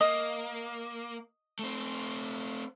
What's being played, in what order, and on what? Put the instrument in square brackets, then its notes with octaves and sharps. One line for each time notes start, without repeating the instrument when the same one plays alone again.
[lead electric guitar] A#3 [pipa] D#5
[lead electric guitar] A3 C4